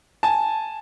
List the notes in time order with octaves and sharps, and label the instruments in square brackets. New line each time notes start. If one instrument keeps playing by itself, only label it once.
[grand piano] G#5 A5